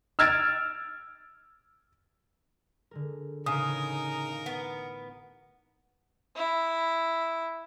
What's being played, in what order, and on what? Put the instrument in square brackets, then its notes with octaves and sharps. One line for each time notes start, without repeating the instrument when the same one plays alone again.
[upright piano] E6 F6 G#6 A6 D7
[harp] D3 G#3 A#4
[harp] A1 [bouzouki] C#3 [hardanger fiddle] D#4 A#4 [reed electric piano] D#6
[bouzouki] B3 [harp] C#6 F6 A6
[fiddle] E4